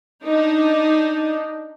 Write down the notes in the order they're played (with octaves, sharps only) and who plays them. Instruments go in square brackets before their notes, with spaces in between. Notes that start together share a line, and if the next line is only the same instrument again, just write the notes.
[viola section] D4 D#4